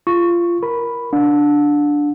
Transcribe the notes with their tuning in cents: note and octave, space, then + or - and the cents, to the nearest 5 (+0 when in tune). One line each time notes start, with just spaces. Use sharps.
F4 -20 C#6 +0
A#4 +10 B5 +0
D4 +0 F#5 -45